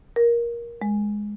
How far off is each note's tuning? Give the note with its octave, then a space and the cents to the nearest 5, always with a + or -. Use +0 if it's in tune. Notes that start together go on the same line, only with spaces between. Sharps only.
A#4 +15
G#3 +0